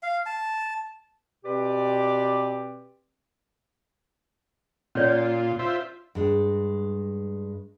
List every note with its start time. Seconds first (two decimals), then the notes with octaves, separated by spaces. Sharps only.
0.03 F5
0.26 A5
1.45 B2 C4 G4 B4 D5 D6
4.95 A#2 C#4 F4 C#5 D5
5.59 F4 C5 E5
6.15 G2 G#3